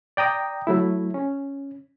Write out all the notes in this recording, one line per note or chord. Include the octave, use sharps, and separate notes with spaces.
D5 G5 A#5 D#6
F#3 A3 E4
C#4